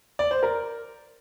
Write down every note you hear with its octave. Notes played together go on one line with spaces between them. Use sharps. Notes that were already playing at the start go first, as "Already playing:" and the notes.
D5
C5
A#4